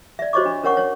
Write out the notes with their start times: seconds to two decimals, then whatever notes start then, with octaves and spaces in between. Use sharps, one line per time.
0.19 D5 E5
0.33 F#4 C5 C#5 D#5 C#6 D6
0.45 D4
0.64 C#4 A#4 C#5 F#5 C#6
0.77 C#5